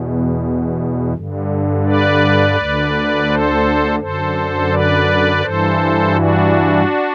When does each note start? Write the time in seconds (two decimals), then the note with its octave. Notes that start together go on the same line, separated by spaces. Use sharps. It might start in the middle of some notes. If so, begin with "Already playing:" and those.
Already playing: E2 B2
1.14 G2 D3
1.85 B4 D5
2.56 D2 D3
3.28 A4 C5
3.99 F#2 D3 A4 C5
4.71 B4 D5
5.42 G2 E3 A4 C5
6.13 D4 F#4